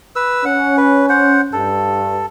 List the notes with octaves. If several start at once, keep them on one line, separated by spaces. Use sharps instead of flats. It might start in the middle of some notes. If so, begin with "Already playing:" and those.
B4 E6
C#4 F#5
B4
C5 F#5
G2 A4